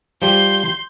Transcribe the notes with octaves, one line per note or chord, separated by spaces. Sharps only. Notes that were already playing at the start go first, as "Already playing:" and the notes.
F3 G3 C6 G6